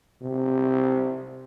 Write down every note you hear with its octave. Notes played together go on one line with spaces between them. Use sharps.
C3